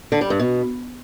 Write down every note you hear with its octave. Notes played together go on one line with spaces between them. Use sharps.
D3
G3
G2
B2